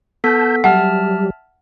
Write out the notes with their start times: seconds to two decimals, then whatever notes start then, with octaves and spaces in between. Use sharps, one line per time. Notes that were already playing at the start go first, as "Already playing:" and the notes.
0.24 B3 A4 A5 G6 B6
0.64 F#3 G3 G4 E5 F#5 A5 F6